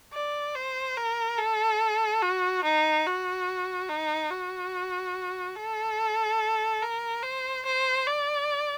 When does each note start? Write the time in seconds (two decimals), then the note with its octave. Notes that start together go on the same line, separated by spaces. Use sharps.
0.14 D5
0.55 C5
0.97 A#4
1.39 A4
2.22 F#4
2.64 D#4
3.06 F#4
3.89 D#4
4.31 F#4
5.56 A4
6.82 A#4
7.23 C5
7.66 C5
8.07 D5